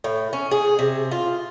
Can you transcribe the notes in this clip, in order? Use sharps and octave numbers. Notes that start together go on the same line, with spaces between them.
A2
C#4
G#4
C3
F4